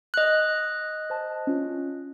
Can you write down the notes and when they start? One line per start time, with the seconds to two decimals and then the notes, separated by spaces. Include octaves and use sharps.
0.14 D#5 F#6
1.10 C5 A5
1.47 C#4 F4